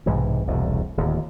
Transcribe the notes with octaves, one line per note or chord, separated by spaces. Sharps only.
B1 G#2 C3 E3
E1 C2 A2
D1 D#2